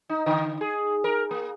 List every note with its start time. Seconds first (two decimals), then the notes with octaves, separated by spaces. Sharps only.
0.09 D#4
0.26 D3
0.61 G#4
1.04 A#4
1.31 A#3